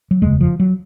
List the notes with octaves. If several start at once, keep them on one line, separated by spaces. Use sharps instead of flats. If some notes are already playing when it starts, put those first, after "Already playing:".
F#3
F1 D#2 C#3 G#3
F3
F#3